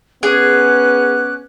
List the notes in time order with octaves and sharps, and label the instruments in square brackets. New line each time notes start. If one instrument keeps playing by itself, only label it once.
[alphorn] B3 [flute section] C#4 D6 F#6 [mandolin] G#4